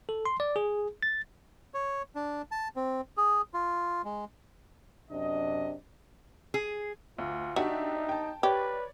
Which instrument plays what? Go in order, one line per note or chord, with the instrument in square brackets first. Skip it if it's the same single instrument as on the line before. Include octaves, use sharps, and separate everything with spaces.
[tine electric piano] A4
C6
D5
G#4
A6
[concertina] C#5
D4
A5
C4
G#4
F4
G#3
[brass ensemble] F#2 C3 D#5 [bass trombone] D4
[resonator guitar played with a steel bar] G#4
[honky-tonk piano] D2 [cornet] F4
[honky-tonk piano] D4 G4 E5 [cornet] D#4 [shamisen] F#4
[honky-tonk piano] G5 A5
[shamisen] G4 [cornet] B4 [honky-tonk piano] C#5 D5